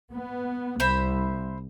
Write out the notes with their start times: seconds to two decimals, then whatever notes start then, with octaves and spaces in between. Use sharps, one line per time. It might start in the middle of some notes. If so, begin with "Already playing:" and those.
0.12 B3
0.80 C2 C5 E5 B5